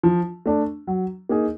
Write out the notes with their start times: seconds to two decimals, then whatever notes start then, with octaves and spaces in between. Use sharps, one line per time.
0.03 F3
0.46 A3 D4
0.87 F#3
1.29 A#3 D#4 G#4